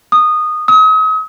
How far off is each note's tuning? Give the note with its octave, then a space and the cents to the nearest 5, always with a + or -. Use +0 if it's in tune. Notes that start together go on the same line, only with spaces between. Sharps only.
D#6 -15
D#6 +40